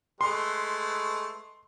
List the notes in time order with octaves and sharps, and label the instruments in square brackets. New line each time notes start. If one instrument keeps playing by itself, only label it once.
[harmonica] G#3 A3 B4 [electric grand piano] C6